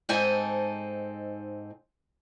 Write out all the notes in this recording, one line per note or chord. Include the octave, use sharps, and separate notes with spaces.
G#2 C4 D#4 A4 D#5 G#5